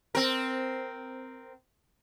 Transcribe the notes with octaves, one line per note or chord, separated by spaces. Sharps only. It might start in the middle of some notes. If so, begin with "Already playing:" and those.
C4 A#4